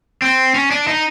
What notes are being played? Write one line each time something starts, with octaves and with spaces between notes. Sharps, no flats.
C4
C#4
D4
D#4